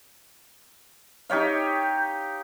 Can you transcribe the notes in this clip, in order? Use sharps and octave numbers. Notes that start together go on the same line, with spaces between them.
D#4 G4 C#5 F5